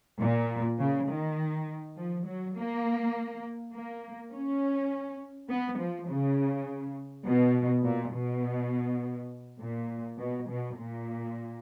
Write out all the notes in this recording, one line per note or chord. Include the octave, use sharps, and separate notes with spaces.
A#2
C#3
D#3
F3
F#3
A#3
A#3
C#4
B3
F3
C#3
B2
A#2
B2
A#2
B2
B2
A#2